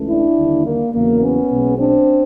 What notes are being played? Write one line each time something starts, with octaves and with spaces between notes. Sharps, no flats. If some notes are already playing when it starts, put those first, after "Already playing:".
Already playing: C#2 C#3 E3 A3
D4 E4
D#2 D3 G3 A#3
A#3
E2 C#3 F#3 A#3
B3 C#4
B1 B2 G#3
C4 D4